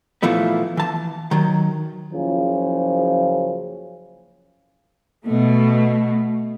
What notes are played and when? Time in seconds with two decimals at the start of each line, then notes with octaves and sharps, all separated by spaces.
0.23 A#2 E3 F3 A3 B3
0.77 E3 A5
1.31 D#3 F#3
2.13 F#1 C#3 F3
5.26 B2 A3